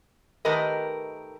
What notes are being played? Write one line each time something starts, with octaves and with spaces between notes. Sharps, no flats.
D#3 A3 G4 A#4 B4 D#5